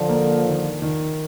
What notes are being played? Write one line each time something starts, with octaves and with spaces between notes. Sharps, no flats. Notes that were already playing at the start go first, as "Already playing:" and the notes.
Already playing: D3 F3
A#3
D#3
D#3